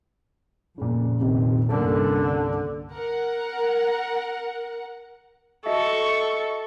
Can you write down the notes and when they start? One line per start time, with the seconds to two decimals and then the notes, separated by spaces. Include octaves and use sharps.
0.78 F2 A#2 C#3
1.21 A#1 F2 C3 D#3
1.69 C2 G2 D3 A#3 C#4 A4
2.91 A#4 F#5
5.66 F#4 A4 D#5 E5 C#6